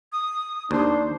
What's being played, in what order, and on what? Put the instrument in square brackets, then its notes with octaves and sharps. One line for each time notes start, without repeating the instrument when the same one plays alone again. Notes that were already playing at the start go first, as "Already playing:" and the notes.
[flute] D#6
[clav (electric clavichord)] D#2 [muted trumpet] D4 [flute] C5